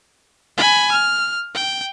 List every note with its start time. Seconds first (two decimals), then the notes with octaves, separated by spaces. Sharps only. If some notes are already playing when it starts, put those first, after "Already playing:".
0.58 G#5 B5
0.92 F6
1.55 G5